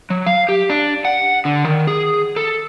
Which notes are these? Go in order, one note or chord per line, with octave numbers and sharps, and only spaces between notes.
F#3
F5
G4
D4
F#5
D3
D#3
G#4
A4